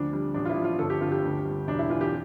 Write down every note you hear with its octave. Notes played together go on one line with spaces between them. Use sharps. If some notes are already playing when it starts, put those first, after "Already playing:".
Already playing: D2 F3 D4
G3
A1 D4
F4
E4
F3
F4
G1 A4
G4
D3 F4
G4
D2
G3
E1 D4
E4
E3 F4
G4